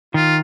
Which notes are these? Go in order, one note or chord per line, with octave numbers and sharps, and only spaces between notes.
D#3 F4